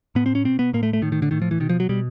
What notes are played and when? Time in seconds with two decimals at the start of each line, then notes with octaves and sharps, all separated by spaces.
0.15 A2 B3
0.26 C4
0.35 C#4
0.45 B2 C4
0.59 B3
0.73 A2 A#3
0.83 A3
0.93 A3
1.02 A2 D#3
1.12 D#3
1.22 D3
1.31 A2 D#3
1.42 F3
1.51 E3
1.60 B2 D#3
1.69 F3
1.80 F#3
1.89 B2 G3